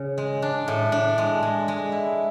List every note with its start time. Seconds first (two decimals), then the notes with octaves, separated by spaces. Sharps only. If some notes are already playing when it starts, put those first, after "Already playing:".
Already playing: C#3
0.18 G#3
0.42 D4
0.68 A2
0.92 D4
1.18 G#3
1.43 G#3
1.68 G#3
1.92 E4